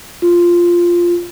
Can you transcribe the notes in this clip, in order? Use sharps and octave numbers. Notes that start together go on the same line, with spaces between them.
F4